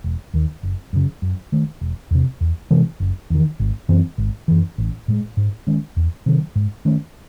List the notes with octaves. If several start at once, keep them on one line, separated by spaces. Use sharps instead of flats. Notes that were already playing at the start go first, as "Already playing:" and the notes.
E1
D#2 D#3
F#1
F#2 C#3
F#2
D#3 A3
E1
E2 C3
E2
C3 E3 G#3
F#1
E2 D#3
G#1
F#2 E3 C4
G#1
F#2 E3
A1
A2 G#3
G#2
D#3 G#3 C#4
E2
C3 D#3 F#3
G#2
D#3 A3 C#4